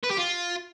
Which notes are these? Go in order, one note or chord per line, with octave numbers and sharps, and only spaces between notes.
B4
G4
F4